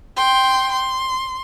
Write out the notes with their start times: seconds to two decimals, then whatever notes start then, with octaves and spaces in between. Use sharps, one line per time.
0.17 G5 C6
0.72 C6